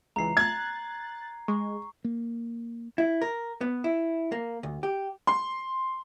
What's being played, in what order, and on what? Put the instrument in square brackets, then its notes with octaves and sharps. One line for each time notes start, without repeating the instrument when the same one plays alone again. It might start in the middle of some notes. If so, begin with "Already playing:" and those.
[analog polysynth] C#2 E3 [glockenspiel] A#5 C7
[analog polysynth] F#6 A6 [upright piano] G#6
[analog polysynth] G#3 [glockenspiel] C#6
[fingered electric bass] A#3
[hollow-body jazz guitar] E4
A#4
B3
E4
A#3
D2
G4
[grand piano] C6